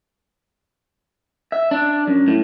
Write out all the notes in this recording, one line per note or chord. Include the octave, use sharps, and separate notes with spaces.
E5
D4
F#2
A2